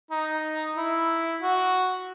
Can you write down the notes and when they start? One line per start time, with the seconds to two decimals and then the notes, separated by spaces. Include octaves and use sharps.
0.11 D#4
0.76 E4
1.41 F#4